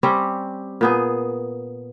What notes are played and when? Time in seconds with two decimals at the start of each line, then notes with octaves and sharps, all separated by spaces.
0.03 G3 C4 C#4 G4
0.81 A#2 B3 G#4